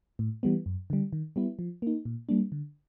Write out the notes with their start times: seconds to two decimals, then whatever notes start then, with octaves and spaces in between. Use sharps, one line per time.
0.19 A2
0.43 E3 G3 B3
0.66 F#2
0.90 D3 G3
1.13 D#3
1.36 G3 B3 E4
1.59 F3
1.82 A#3 D#4
2.05 A#2
2.29 G3 A#3 D4
2.52 D3